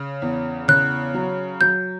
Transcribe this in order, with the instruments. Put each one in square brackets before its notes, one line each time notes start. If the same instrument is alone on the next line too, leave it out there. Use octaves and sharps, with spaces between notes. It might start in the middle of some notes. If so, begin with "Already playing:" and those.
Already playing: [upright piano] C#3
E2
[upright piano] C#3 [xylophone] F#6
[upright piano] F#3
[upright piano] F#3 [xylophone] G6